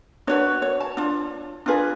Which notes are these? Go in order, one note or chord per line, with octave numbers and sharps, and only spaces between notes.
D4 F#4 B4 C#5
C#5
A5
D4 F4
D4 F4 G#4 B4